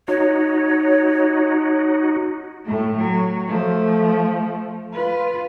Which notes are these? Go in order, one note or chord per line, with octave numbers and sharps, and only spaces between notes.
D#4 F#4 C#5
A2 A3
F#3
F3 A3
F4 B4